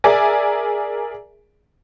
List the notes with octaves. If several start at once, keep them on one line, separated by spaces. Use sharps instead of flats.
G#4 A#4 D5 E5 G#5